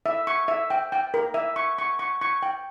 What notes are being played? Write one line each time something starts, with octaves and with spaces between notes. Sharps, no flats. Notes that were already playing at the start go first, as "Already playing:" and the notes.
E5
C#6
E5
G5
G5
A#4
E5
C#6
C#6
C#6
C#6
G5